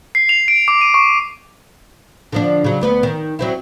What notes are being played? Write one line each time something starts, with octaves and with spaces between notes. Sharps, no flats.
C7
F7
D7
D6
D#7
C#6
D3 F3 D4
C#3 F#3
D2 B3 B4
D#3
F#3 C4 E4